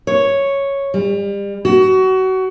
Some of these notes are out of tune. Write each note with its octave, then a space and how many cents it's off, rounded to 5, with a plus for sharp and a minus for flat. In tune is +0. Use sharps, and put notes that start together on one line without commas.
C#5 +0
G3 +35
F#4 +25